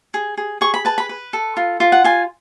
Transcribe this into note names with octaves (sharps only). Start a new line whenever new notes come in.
G#4
G#4
G#4 C#6
B5
B4 A5
B5
B4
A4
F4
F4
F#5
F4 G#5